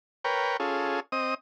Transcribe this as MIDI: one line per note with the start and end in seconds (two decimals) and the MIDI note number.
0.24 0.57 70
0.24 0.57 71
0.24 0.57 73
0.24 0.57 79
0.60 1.00 61
0.60 1.00 65
0.60 1.00 68
0.60 1.00 69
1.12 1.34 60
1.12 1.34 75
1.12 1.34 87